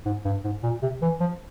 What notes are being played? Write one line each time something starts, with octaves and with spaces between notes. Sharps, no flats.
G#2
G2
G#2
A#2
C3
E3
F3